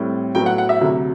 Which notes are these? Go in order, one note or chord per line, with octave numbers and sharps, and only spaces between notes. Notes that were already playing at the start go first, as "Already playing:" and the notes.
Already playing: A2 G3 C4
A2 F#3 B3 G5
F#5
F#5
E5
D2 C3 F#3